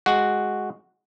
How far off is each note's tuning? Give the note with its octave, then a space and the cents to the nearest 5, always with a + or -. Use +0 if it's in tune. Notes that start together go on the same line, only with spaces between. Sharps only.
G#3 +0 F#4 +0